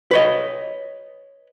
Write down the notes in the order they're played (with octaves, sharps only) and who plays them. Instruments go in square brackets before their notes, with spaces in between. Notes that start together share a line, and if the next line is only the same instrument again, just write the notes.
[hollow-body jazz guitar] B4 C#5 D#5